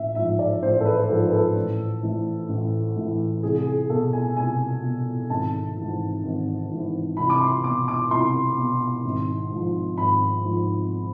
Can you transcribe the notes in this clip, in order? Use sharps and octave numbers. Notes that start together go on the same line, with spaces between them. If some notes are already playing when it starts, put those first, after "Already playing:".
Already playing: A1 E5
G#2 F3 E5
D5
A1 C5
A4
B4
B4
G#2 F3 A4
B4
A4
A1
A2 E3
A1
A2 E3
C2 G#4
G#4
B2 A4
G#5
C2 G#5
B2
G#1 A5
G#2 E3
G#1
G#2 E3
C2 B5
D6
C6
B2 D6
D6
C2 C6
B2
G#1
G#2 F3
G#1 B5
G#2 F3